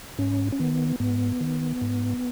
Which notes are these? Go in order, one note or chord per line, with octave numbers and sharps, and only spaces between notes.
G#2 C#4
C#4
D#3 B3
G#2 B3
D#3
G#2